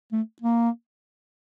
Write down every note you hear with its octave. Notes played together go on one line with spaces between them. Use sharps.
A3
A#3